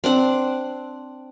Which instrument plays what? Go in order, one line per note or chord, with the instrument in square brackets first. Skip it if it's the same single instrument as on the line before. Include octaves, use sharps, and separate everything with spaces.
[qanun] C4 D4 F#5